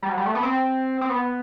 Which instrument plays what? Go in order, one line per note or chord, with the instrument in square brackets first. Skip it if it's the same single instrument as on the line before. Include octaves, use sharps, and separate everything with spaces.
[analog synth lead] G3
F#3
G3
A3
B3
C4
C4
B3